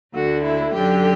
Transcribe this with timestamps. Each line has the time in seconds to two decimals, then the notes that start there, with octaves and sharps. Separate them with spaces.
0.14 D2 D3 F#4
0.44 E4
0.73 F#2 D3 G4